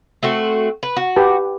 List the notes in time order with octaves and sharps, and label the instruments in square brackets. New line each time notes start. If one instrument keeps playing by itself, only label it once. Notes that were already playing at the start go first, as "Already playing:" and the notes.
[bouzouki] A3 C4 F#4
B4
F#4
[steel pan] G4 B4 A5